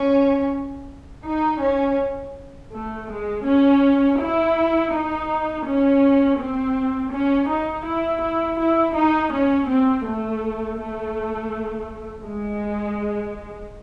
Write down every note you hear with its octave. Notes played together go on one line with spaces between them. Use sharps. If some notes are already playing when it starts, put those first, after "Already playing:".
Already playing: C#4
D#4
C#4
A3
G#3
C#4
E4
D#4
C#4
C4
C#4
D#4
E4
E4
E4
D#4
C#4
C4
A3
A3
G#3